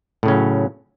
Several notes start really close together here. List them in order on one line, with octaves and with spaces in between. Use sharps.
A2 C#3 C#4 F#3